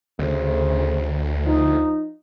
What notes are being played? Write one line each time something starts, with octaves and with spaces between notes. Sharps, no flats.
D2 C#3 A3 C5
F3 D#4